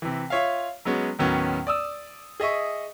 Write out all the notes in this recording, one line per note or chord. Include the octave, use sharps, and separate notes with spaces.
C3 E3
F4 C#5 E5 F5
F#3 G#3 B3 C#4
D#2 A2 D#3 F#3 B3 C#4
D5 D#6 E6
G#4 D#5 E5 C#6